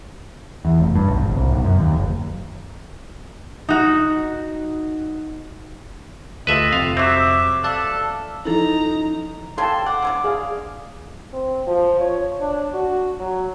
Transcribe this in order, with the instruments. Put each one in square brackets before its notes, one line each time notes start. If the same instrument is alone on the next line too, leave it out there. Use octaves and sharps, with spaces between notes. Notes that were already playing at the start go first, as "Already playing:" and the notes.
[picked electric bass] E2
F1
G2
B1
G#1
C2
B1
F#2
D#2
F#1
[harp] D#4 F#4
[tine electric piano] D2 F4 G4 [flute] A4 [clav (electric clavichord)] B4 E5 [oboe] D#5
[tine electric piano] F2 C3 [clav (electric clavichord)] F5
[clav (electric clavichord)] F#3 C4 [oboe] E5 [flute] D6
[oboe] A4 [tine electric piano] D5 F5 F#6 [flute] A5
[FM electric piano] F3 C#4 [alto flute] D#4 [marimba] E4 A4 [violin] A#5
[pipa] C#3 G3 [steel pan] A4 A5 [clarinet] C6
[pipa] F#5 [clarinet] D6
[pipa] D3 C#4 D4
[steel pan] G#4 D5 F5
[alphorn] C4
F3
C#5
D4
F#4
F#3